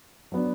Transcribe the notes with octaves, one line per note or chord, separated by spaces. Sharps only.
F#3 B3 D4